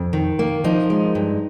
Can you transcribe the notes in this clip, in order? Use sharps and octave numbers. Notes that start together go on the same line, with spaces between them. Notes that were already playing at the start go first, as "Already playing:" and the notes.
Already playing: F2
D#3
A#3
F3 D#4
G#3
G2